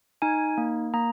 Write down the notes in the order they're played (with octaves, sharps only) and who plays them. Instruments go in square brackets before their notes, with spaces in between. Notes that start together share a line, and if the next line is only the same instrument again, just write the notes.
[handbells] D#4 G#5
A#3
A#3 A#5